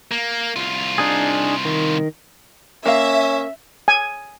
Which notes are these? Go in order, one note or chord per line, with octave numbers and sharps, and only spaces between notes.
A#3
C2 F4
D4 D#4 G#4
D#3
A#3 C#4 E5 F5
G#5